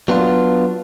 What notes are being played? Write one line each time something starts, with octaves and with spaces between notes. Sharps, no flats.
F#3 B3 D4 F4